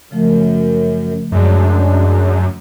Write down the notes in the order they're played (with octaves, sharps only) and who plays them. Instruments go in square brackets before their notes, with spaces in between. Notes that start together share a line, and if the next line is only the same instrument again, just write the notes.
[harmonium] F#2 [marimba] C#3 F3 A3
[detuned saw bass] F#2 [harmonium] G#3 D4